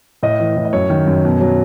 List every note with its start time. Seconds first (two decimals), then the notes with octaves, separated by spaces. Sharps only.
0.23 A2 D#5
0.40 E3
0.57 A2
0.65 D#5
0.73 F#2 C#5
0.90 D#3
1.07 F#2
1.25 B2
1.41 F#3